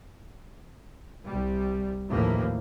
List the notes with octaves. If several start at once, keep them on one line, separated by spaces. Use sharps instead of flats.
C2 G3
A1 D#2 A2 F3 A#3